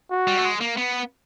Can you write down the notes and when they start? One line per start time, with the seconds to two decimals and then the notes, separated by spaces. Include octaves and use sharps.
0.11 F#4
0.28 G3
0.38 A3
0.45 G#3
0.61 A#3
0.77 B3